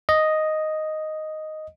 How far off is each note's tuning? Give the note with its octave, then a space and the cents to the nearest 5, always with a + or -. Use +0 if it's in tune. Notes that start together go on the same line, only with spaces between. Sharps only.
D#5 +0